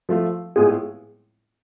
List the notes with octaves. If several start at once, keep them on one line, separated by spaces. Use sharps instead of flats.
F3 A3 F4
A2 G#3 B3 F4 G#4